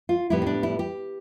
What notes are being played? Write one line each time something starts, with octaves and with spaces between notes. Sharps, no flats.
F4
A2 G3 B3 E4
C4
D4
E4
G4